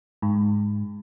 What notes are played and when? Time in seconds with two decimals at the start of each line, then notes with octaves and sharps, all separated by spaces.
0.22 G#2